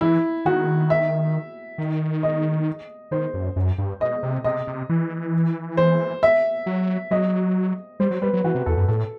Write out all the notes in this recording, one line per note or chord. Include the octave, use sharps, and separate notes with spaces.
E3 E4
D#3 F#4
E5
D#3
D#5
D#3 C5
F#2
F#2
G2
B2 D#5
C3
C3 D#5
C3
E3
C5
E5
F#3
F#3 D#5
G3 C5
F#3
G3 B4
F#3
E3 F#4
C3
E2 A4
F#2
A2 A4